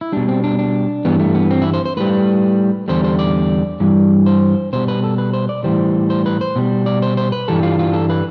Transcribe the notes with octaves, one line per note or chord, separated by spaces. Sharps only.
E4
B2 G3 D4
C4
D4
D4
G2 E3 G3 B3
A3
B3
C4
E4
C5
C5
A2 G3 B4
E2 D3 G3 C5
C5
D5
G2 E3 G3
C5
B2 G3 C5
B4
A4
B4
C5
D5
A2 E3 G3 C5
C5
B4
C5
B2 G3
D5
C5
C5
B4
G2 E3 G3 A4
F4
F4
A4
B4